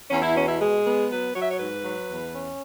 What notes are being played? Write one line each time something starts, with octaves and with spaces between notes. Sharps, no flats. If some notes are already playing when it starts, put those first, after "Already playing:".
E2 C#4
E4
B2 C#4
E4
G#3 G#4
B3
F#3 B4
F#3 C#5
E5
C#5
G#2 B4
F#3
E2
C#4